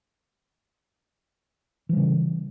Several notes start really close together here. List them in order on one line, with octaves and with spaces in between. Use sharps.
E3 G3 C#3